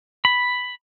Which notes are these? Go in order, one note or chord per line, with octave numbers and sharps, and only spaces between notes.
B5